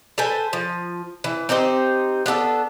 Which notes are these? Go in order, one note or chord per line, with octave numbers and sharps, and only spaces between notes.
A4 B4 C5 G#5
F3
E3
C4 D#4 G4 C5
B3 D4 G#4 A4